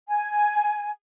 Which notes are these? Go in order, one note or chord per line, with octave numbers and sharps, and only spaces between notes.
G#5